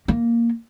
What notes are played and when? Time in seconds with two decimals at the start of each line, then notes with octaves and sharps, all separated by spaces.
0.08 A#3